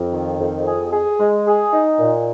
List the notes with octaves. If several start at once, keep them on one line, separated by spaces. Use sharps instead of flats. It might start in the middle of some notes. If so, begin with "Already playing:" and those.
Already playing: F2
D#3
F2
G#4
G#4
G#3
G#4
D#4
A#2